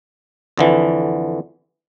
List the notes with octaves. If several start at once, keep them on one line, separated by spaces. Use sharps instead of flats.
F2 D3 E3